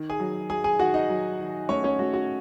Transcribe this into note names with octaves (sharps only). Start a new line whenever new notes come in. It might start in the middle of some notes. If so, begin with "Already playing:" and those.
Already playing: D#3
G#4 G#5
F#3
F#3 G#4 G#5
G#4 G#5
D#3 F#4 F#5
D#4 D#5
F#3
D#3
A3 C#4 C#5
C#4 C#5
A3 F#4
F#4